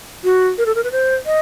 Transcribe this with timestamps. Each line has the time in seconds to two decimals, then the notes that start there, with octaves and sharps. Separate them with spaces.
0.24 F#4
0.58 A#4
0.66 A4
0.75 A#4
0.84 B4
0.92 C5
1.26 D#5